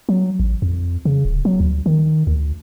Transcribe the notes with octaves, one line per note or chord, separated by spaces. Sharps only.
F#3
A1
F2
C#3
D1
F#3
D2
D#3
D2